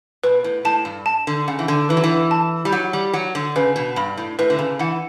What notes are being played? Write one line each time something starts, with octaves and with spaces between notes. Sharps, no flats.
B2 B4
A2
A2 A5
G2
A5
D3
C#3 F#5
E3
D3
E3 B4
F#3
E3
A5
G3
F#3 F#5
G3
F#3 F#5
D3
C#3 B4
B2
G2 B5
A2
A2 B4
D3
C#3
E3 F#5